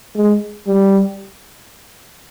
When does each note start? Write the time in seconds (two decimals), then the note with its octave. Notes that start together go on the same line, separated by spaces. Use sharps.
0.16 G#3
0.67 G3